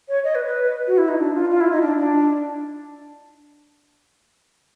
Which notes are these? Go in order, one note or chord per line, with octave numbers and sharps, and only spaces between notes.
C#5
D#5
B4
B4
F#4
E4
D#4
D4
F4
F4
E4
D#4
D4
D4